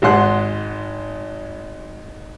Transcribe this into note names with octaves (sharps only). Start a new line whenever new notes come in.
G#1 G#2 C5 F#5 C6 F#6